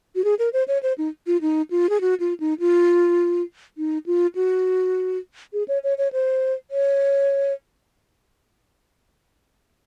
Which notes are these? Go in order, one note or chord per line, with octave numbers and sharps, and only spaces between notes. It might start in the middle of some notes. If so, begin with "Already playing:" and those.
F#4
G#4
A#4
C5
C#5
C5
D#4
F4
D#4
F4
G#4
F#4
F4
D#4
F4
D#4
F4
F#4
G#4
C#5
C#5
C#5
C5
C#5